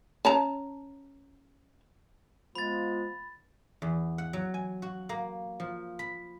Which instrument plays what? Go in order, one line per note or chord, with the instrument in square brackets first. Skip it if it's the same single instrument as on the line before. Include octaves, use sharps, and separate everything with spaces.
[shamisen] C#4 A5 A#5
[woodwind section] F3 G#3 B3 [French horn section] F4 [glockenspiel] B5 A6
[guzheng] E2
F#5
F#3
G#5
F#4
A#3
F3
B5